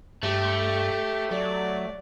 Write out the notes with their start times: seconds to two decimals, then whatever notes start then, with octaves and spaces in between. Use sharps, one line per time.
0.23 G2 A3 G4
1.31 F#3 D5